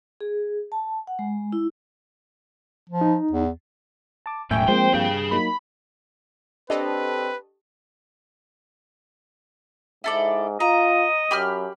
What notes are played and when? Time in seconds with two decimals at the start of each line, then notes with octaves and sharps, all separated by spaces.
0.21 G#4
0.72 A5
1.07 F#5
1.19 G#3
1.53 E4
2.89 F3
3.01 D#4
3.31 E2
4.26 A5 D6
4.51 E1 C2 F#2 A2 E5 G5 G#5 C#6
4.68 F3 G#3 A#3 C4 C5
4.94 G2 G#4 F5
5.31 F#3 A#3 D#4 B5
6.70 C4 D4 G4 A4 B4 D#5 A5
10.04 G#2 E4 A4 D5
10.60 F4 D#5 A#5
11.31 F#2 G4 B5 F6